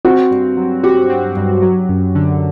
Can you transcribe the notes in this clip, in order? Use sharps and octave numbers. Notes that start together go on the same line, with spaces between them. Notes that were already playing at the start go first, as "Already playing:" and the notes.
C4 F#4
G2
F#3
F#4 G4
C4
G2
F#3
F#2
D3